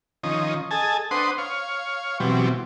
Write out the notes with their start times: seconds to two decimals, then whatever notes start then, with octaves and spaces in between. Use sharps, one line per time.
0.23 D#3 F3 C#4 D#5
0.71 G#4 A4 D#5 G#5 A5
1.11 D4 B4 C5 F#5 C6 D#6
1.38 C#5 F5
2.20 B2 E3 F#3 G3 C4